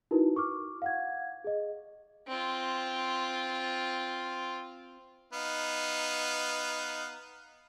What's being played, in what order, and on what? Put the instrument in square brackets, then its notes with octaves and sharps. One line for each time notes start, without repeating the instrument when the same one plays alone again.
[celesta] D#4 E4 F#4 A#4 B4
C#6 D6 F6
F5 F#5 G#6
G#4 D#5
[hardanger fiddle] C4 F4
[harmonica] B3 D#4 F5